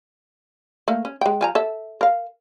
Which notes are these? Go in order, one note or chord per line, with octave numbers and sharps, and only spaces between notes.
A3 A#3
C#4
G#3 G5
F3 G#5 A#5
A4 E5
A#4 F5